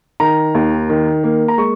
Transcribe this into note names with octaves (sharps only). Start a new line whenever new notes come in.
D#3 A#5
D#2
D#3
A#3
A#5
G#3 C#6